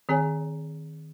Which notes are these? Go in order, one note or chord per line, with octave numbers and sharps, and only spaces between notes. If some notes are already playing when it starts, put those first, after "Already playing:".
D#3 C4 G#4 C#5 G#5